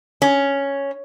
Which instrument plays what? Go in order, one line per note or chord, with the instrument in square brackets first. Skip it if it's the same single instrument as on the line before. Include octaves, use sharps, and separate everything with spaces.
[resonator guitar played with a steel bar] C#4